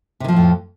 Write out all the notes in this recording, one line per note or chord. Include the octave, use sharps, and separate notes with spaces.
F2 A2 C3 D#3 F3